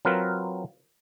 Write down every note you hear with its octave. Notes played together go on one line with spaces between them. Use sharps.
F#3 C4 F4 A#4 B4